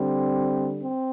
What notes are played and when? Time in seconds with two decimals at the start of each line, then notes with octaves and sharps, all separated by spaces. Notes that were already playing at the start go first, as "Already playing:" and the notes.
Already playing: D3 G3 C4
0.82 C4